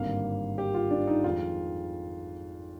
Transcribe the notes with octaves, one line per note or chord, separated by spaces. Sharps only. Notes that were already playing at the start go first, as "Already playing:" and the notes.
Already playing: G#1 G2 D3 G3 A#3 F5
G4
F4
D4
D#4
F2 D#3 G#3 F4